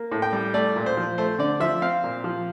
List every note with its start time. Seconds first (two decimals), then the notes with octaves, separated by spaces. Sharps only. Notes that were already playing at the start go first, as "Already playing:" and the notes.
Already playing: A#3
0.12 A2
0.22 G5
0.33 G3
0.54 A3 D5
0.76 A#2
0.86 C5
0.97 F3
1.18 A3 C5
1.39 D3 D5
1.60 F3 E5
1.82 C4 F5
2.04 A#2
2.24 F3